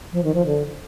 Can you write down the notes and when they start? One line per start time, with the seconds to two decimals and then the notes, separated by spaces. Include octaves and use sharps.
0.13 F3
0.24 D#3
0.34 F3
0.47 D3